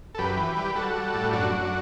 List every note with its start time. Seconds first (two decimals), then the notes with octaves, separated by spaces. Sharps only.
0.15 A4
0.18 F#2 G4 B4
0.37 E3
0.57 G3
0.71 B4
0.75 G3 F#4 A4
0.95 G3
1.14 A2
1.32 F#2 D4 F#4
1.52 F#2